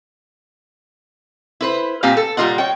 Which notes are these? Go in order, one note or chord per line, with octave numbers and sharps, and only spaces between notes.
E4 B4 C5
A#2 G3 C4 G4 F5 G#5
A4
A#2 G3 A#3 F4 D#5 F#5
C#5 G5